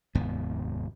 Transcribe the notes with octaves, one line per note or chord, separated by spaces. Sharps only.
F1 D#2 G#2 B3